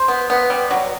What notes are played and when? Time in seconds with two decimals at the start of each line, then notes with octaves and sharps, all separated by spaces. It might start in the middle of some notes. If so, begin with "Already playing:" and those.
Already playing: C5
0.08 B3
0.30 B3
0.50 G3
0.71 F#3